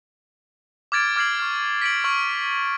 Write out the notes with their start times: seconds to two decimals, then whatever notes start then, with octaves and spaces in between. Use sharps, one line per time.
0.92 D6 F6 G#6 A6 D7
1.16 D6 F6 G#6 C7 F#7
1.39 C#6 F6
1.82 B6 D7 F#7
2.04 C#6 F6 F#7